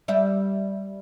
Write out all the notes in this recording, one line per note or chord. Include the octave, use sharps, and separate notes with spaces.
G3 D5 E5